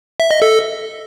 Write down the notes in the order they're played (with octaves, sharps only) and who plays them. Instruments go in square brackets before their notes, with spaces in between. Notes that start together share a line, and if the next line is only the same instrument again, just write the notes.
[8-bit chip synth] E5
D#5
A4